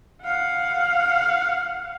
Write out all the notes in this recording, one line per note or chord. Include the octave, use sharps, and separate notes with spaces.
F5 F#5